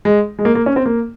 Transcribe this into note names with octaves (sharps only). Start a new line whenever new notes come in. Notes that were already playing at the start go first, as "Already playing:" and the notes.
G#3
G#3
A#3
A#3
C#4
C4
A#3